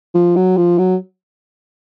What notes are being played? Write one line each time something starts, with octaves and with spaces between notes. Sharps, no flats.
F3
F#3
F3
F#3